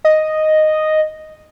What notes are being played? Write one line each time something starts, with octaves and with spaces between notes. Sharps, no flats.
D#5